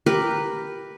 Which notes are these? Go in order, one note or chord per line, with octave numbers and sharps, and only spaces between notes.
G4 A#4 B4